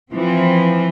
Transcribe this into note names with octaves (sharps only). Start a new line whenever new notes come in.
E3 F3 C4